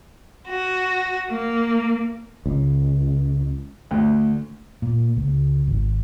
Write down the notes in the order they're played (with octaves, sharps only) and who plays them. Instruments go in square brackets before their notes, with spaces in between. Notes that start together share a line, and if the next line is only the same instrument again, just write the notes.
[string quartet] F#4
A#3
[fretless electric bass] C#2
[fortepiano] D2
[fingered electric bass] A#2
C#2
G#1